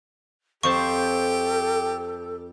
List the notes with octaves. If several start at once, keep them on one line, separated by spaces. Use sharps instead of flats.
F2 G4 A4 C5 A5 C#6